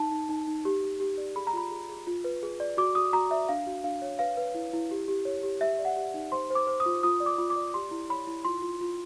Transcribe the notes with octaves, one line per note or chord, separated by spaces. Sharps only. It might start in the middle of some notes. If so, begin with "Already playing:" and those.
Already playing: D#4 A5
D#4
D#4
D#4
G4
G4
G4
D5
G#4 B5
A#5
F4 B5
G#4
G#4
F4
B4
G#4
D5
F#4 D6
F#4 D#6
F#4 A#5
D5 E5
D4 F5
F#4
D4 F5
C#5
B4 F5
B4
E4
E4
G4
G4
C#5
G4
G4 E5
D5
F#5
G4
D#4
C5 C6
C5
D6
C5
D#6
F4
F4 D#6
D5
D6
F4
D6
D5
G4 C6
E4
C#5 B5
E4
F4 C6
F4
F4